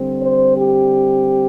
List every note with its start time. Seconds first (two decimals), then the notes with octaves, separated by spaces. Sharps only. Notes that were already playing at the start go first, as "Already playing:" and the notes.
Already playing: D3 G3 C4
0.20 C5
0.54 G4